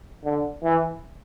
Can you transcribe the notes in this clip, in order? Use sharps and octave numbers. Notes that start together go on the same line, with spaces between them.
D3
E3